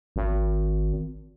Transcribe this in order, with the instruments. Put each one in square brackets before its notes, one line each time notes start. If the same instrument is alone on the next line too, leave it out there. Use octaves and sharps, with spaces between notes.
[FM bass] G#1